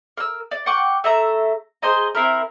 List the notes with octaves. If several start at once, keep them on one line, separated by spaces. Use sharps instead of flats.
A#4 E6
D5
F#5 G5 C#6 D6
A3 E5 A#5
G#4 C5 D#5 A#5
C4 E4 A#4